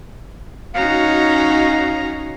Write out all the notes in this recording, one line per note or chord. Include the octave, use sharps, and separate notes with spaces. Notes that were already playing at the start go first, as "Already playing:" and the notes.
C#4 D#4 F#4 F5 A#5